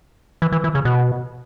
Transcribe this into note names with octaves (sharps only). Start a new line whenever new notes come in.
E3
E3
E3
C#3
B2